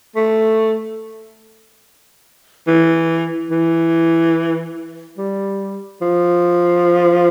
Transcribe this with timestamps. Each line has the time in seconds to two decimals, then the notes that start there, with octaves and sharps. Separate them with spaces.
0.16 A3
2.67 E3
3.51 E3
5.18 G3
6.02 F3